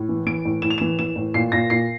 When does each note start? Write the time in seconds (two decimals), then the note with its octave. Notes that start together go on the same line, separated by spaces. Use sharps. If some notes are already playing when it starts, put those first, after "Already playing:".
Already playing: A2
0.09 E3
0.26 E3 D7
0.45 A2
0.62 A2 E7
0.70 F7
0.78 E7
0.81 E3
0.99 E3 E7
1.16 A2
1.34 A#2 C7
1.52 A#2 A#6
1.70 A#2 C7